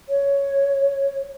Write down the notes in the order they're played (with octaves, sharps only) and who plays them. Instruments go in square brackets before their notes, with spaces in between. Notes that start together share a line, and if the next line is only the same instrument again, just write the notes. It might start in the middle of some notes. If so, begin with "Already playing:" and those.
[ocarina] C#5